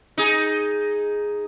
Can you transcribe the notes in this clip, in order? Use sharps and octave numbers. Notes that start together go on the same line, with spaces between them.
D#4 G#4